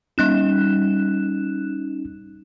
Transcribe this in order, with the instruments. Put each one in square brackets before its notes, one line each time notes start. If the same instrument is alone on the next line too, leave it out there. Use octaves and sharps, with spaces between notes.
[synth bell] G3 F#6 E7 [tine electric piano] C#4 D#4